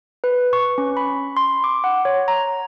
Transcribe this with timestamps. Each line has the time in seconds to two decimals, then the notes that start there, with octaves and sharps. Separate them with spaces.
0.24 B4
0.53 C#6
0.78 C#4
0.97 B5
1.37 C6
1.64 D6
1.84 F#5
2.05 C#5
2.28 A#5